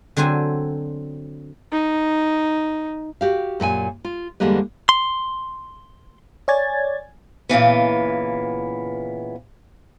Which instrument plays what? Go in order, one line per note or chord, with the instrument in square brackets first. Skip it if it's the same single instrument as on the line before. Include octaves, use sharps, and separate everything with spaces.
[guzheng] D3 F#3 C4 C5 G#5
[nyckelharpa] D#4
[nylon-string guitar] F#4 G4 F5
F#2 A#2 G5 G#5
F4
E2 D3 G3 G#3 A#3 B4
[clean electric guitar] C6
[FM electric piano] C#5 D5 G#5 G#6 A6
[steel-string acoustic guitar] A#2 C#3 E3 B3